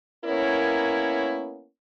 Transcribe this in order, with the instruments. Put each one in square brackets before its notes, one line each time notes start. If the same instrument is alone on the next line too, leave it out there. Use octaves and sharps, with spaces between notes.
[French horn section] A#3 B3 C#4 E4 A#4 C#5